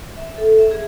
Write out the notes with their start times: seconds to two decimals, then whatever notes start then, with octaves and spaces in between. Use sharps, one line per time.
0.17 E5
0.38 A4
0.58 E5
0.71 G#4